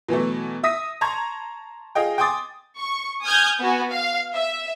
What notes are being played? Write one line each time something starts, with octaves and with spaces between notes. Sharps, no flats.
B2 E3 F#3 A3
E5 D#6 A#6 B6 D#7
A5 A#5 C6 C#6 G#6
F4 G#4 D#5 G5
G5 G#5 C6 D6 D#6 A6
C#6
G#5 D#6 F6 G6 G#6
B3 F#4 G#5
F5
E5